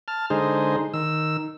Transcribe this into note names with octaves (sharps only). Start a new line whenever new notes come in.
A5 F6
D3 G#3 D#4 G#4 C5
D#3 E6